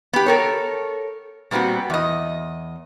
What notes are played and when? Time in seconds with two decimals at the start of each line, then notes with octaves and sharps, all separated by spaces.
0.13 B3 G4
0.26 A4 A#4 C#5
1.51 A#2 G3 B3 C4 F#4
1.90 E2 D#5